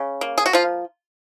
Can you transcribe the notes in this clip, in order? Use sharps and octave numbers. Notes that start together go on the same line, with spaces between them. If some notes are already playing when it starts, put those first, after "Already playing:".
Already playing: C#3
A#3
G#4
F#4
F3 F4